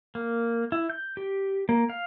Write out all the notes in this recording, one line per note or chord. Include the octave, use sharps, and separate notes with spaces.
A#3
E4
G6
G4
A#3
F5